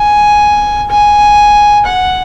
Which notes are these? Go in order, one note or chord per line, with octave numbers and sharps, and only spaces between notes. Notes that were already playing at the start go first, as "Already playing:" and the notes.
Already playing: G#5
G#5
F#5